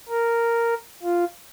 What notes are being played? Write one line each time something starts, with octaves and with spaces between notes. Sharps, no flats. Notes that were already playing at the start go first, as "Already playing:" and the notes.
A#4
F4